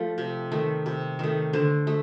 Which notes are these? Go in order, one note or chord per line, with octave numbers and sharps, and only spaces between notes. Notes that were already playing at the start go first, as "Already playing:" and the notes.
Already playing: F3 A3
C3
D#3 A3
C3
D#3 A3
D3 C5
A3